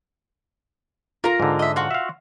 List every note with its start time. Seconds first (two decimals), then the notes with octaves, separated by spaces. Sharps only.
1.24 F4 A#4 A#5
1.40 G#2 D3
1.59 D#5 E5
1.76 F4 F#4 F#5
1.91 E5 F5